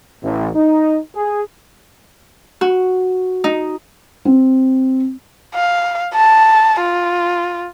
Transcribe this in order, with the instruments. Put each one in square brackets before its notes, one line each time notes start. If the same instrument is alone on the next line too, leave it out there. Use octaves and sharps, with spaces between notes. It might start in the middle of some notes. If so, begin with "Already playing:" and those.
[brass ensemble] A1
D#4
G#4
[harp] F#4
D#4
[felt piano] C4
[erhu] F5
A5
F4